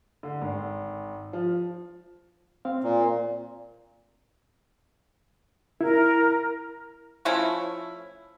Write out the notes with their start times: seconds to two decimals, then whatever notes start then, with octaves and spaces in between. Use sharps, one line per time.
0.23 D3
0.41 G#1
1.33 F3
2.65 C4 F5
2.84 A#2
5.81 E4 A#4
7.25 F3 A3 C#4 E4